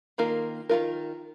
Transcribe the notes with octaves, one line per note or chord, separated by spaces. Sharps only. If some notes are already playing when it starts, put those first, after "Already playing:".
D#3 A#3 F4 A#4
D#3 A#3 F4 A#4